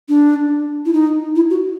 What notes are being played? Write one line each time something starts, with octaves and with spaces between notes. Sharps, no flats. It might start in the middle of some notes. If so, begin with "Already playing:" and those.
D4
E4
D#4
E4
F#4